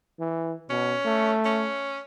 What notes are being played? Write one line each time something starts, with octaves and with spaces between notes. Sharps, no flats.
E3
B2 C#4
A3
C#4